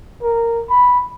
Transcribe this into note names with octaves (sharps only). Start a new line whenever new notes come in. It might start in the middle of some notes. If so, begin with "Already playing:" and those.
A#4
B5